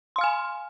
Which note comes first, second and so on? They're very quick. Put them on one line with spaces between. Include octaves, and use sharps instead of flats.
C6 F5 F6 G#5